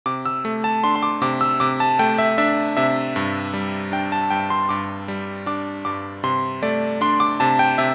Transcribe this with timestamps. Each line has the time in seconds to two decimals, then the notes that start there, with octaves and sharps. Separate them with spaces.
0.06 C3 D6
0.26 E6
0.45 A3
0.64 A5
0.84 D4 C6
0.95 C6
1.03 D6
1.22 C3 D6
1.41 E6
1.60 C3 D6
1.80 A5
1.99 A3 G5
2.18 E5
2.38 D4 E5
2.77 C3 E5
3.16 G2
3.53 G3
3.92 D4 G5
4.12 A5
4.30 G2 G5
4.50 C6
4.69 G2 D6
5.08 G3
5.46 D4 D6
5.85 G2 D6
6.23 C3 C6
6.63 A3 D5
7.01 D4 C6
7.20 D6
7.40 C3 A5
7.59 G5
7.78 C3 E5